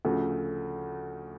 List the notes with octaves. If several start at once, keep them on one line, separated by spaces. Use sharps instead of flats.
D2 C#3 F3 A3